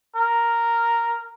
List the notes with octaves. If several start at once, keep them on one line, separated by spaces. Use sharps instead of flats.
A#4